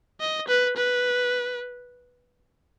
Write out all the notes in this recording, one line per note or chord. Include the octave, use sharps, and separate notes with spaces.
D#5
B4
B4